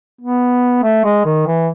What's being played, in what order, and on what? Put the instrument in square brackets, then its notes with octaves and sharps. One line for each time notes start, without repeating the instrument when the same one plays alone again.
[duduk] B3
A3
G#3
D#3
E3